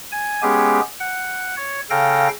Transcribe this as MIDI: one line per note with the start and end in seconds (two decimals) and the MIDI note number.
0.12 0.41 80
0.42 0.80 56
0.42 0.80 59
0.42 0.80 61
0.42 0.80 67
0.42 0.80 68
1.00 1.55 78
1.57 1.80 73
1.90 2.28 49
1.90 2.28 69
1.90 2.28 77
1.90 2.28 79
1.90 2.28 94